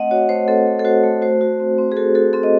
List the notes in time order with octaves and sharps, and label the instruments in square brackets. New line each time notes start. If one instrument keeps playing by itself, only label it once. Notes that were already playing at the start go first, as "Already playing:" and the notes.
Already playing: [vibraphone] A3 C4 D#5 F#5
F#4 C#5
A3 C5
C4 A4
A3
A4
F#4 C5
A3
F#4 C5
F#4
C4
C4
G#4
F#4 A4
F#4 A4
C4 A4
D#5